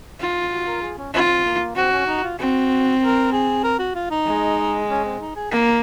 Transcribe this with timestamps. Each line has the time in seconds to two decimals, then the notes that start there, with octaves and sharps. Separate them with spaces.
0.20 F4
0.51 F#4
0.67 A#4
0.82 G#4
0.98 C#4
1.14 C4 F4
1.45 A#3
1.76 C4 F#4
1.92 C#4
2.07 D#4
2.23 F4
2.38 C4 F#4
3.01 A#4
3.32 G#4
3.64 A#4
3.79 F#4
3.95 F4
4.10 D#4
4.26 G#3
4.89 C#4
5.05 C4
5.20 D#4
5.36 G#4
5.51 A#3 A#4